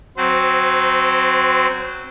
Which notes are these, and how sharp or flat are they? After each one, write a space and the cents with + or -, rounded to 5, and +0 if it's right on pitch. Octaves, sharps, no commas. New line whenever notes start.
F#3 +0 C4 +0 C5 -30